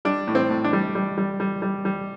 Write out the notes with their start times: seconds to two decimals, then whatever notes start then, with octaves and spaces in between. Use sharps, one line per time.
0.05 G3 D4
0.28 A2
0.35 C4
0.50 A2
0.64 D4
0.73 G3
0.95 G3
1.18 G3
1.40 G3
1.62 G3
1.85 G3